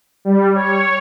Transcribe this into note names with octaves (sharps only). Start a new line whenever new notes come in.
G3
C#5